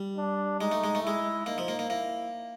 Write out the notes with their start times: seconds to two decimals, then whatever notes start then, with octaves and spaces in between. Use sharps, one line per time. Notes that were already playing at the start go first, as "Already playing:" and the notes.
Already playing: G3
0.17 D4
0.60 G#3 D#4
0.72 A3
0.84 G#3
0.95 A3
1.03 G#3 E4
1.46 A#3 D#4
1.58 F3
1.68 A#3
1.79 A#3
1.90 A#3 E4